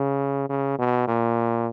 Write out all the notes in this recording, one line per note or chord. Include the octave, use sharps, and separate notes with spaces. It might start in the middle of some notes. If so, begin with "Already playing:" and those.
Already playing: C#3
C#3
B2
A#2